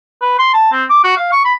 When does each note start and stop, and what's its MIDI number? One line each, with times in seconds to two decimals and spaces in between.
0.22 0.36 71
0.39 0.49 84
0.54 0.70 81
0.72 0.84 60
0.89 1.02 86
1.04 1.14 66
1.17 1.31 77
1.32 1.42 85
1.45 1.54 83